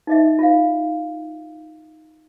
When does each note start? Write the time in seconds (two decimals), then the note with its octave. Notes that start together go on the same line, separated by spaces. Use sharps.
0.07 D#4 D#5 E5
0.39 F4 F5